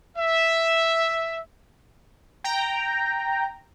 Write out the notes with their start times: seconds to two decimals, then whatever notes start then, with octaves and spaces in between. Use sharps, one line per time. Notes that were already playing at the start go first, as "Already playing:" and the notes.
0.17 E5
2.44 G5 A#5